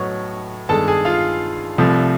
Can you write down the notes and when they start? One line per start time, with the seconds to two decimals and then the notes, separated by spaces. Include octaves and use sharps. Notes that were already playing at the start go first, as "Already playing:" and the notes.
Already playing: A2 F#3 B3 D#4 C#5 C#6
0.69 G2 D#3 G#3 B3 A4 A5
0.88 G#4 G#5
1.05 F4 F5
1.78 C2 C3 F3 A3